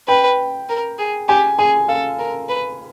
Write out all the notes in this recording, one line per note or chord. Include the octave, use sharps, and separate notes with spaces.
B4 G5
A#4
G#4
G4 G#5
G#4 G#5
A4 F5
A#4
B4